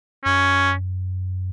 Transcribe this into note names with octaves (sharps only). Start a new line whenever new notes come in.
F#2 C#4